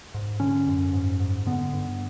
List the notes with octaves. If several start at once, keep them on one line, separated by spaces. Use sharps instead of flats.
G#2
D3 C#4
F#2
G#2
G#2
D3 B3
G2